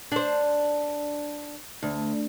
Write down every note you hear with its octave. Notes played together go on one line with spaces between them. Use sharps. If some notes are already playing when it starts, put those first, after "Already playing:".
D4 C5
D2